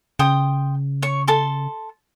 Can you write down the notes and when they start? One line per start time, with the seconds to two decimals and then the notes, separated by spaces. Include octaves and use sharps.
0.19 C#3 G5 C6 D#6
1.02 C#5 C#6
1.28 A4 A5 C6